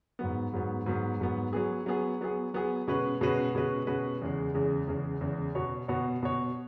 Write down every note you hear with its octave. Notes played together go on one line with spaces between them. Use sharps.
G#2 F#3 B3
G#2 F#3 B3
G#2 F#3 B3
G#2 F#3 B3
F#3 B3 G#4
F#3 B3 G#4
F#3 B3 G#4
F#3 B3 G#4
B2 G#3 C#4 F#4 B4
B2 G#3 C#4 F#4 B4
B2 G#3 C#4 F#4 B4
B2 G#3 C#4 F#4 B4
E2 C#3 G#3
E2 C#3 G#3
E2 C#3 G#3
E2 C#3 G#3
B2 B3 F#4 C#5
B2 B3 F#4 C#5
B2 B3 F#4 C#5